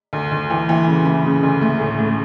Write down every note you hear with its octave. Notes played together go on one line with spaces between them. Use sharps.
D2
D2
E3
E3
C#3
E3
C#3
D2
A3
A2
A2